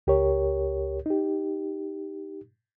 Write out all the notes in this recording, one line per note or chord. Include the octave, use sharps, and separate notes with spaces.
C#2 G4 A#4 C#5
D#4 G4